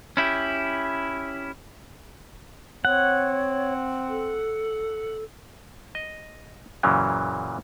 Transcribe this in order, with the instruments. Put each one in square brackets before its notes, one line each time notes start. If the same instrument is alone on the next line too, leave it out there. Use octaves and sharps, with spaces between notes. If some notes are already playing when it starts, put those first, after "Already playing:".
[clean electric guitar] C#4 E4 G4
[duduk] C4 [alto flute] C#5 [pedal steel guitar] F#5
[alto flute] A4
[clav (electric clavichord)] D#5
F#2 A#2 C#3 E3 F#3